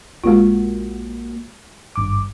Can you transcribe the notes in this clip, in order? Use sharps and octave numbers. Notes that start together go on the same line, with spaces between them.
A#1 G#3 A#3 F4 F#4
G#1 G2 D6